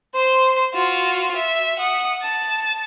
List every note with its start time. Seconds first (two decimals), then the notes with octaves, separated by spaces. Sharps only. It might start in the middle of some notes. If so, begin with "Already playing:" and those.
0.15 C5 C6
0.74 F4 F#4
1.36 E5
1.79 F#5 D#6
2.22 A5